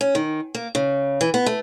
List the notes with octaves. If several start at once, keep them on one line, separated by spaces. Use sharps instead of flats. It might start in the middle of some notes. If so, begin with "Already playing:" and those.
C#4
D#3
A#3
C#3
E3
B3
A3